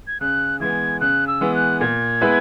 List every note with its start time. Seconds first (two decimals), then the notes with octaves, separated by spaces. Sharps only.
0.07 G#6
0.21 C#3 F#6
0.60 E3 G#3 B3 G#6
1.01 C#3 F#6
1.28 E6
1.41 E3 G#3 B3
1.55 F#6
1.81 A#2 G#6
2.21 G#3 B3 E4 B4